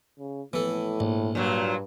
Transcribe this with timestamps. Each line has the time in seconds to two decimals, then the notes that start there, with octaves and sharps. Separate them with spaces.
0.19 C#3
0.53 A2 E3 F3 A#3 B3 A4
1.00 A#1 G#2
1.35 G2 A#2 F#3